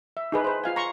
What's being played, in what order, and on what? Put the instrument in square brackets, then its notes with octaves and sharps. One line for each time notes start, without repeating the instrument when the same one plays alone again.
[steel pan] E5
D#4 G#4 B4
B4 C5
F4 F5 G#5
A#5 C6 C#6